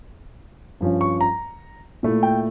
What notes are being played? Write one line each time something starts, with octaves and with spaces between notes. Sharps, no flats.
G2 F3 C#4
C#6
A#5
A#2 A3 E4
G5